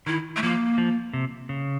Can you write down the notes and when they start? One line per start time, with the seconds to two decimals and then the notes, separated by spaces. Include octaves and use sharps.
0.06 D#3 E4
0.36 A3
0.42 F3 A#3
0.78 F3
1.13 C3
1.49 C#3